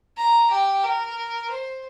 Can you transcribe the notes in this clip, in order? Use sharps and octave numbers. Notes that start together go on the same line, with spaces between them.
A#5
G4
A#4
C5